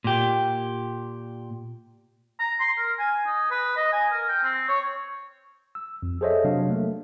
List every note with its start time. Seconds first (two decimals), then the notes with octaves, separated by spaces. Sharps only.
0.04 A#2 G4
2.39 A#5
2.60 C6
2.78 A#4
2.99 G#5
3.26 D#4
3.51 B4
3.77 D#5
3.93 G#5
4.12 A#4
4.29 G5
4.44 C4
4.69 C#5
5.75 E6
6.03 F2
6.21 G#4 A4 C5 C#5 D#5 E5
6.44 C3 F#3 D4 F5
6.69 A3 A#3